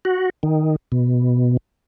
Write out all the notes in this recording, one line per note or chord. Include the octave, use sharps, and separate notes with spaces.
F#4
D#3
B2